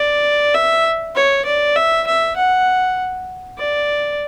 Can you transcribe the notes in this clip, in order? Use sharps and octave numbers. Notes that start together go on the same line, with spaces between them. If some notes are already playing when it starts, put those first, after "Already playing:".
Already playing: D5
E5
C#5
D5
E5
E5
F#5
D5